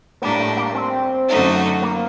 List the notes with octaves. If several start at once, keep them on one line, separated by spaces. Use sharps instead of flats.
A2 G3 A#3 D4
A3
A#3
C4
F#2 D3 A3 D#4 F#4
A#3